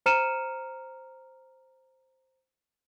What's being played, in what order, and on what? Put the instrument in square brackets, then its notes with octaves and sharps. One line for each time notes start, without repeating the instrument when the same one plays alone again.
[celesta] C5 A#5 F6 C#7 D#7 E7